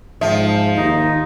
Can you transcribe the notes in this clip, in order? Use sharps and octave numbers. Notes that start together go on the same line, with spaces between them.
G#2 F3 E5
D#2 D#4